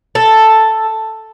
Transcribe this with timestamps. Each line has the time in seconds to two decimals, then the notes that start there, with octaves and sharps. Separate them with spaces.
0.15 A4